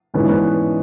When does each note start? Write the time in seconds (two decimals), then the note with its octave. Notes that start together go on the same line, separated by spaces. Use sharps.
0.14 G#2 E3 G#3 B3 C#4
0.23 D4
0.28 B3 C#4